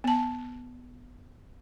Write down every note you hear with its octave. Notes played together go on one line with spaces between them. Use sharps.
B3 A5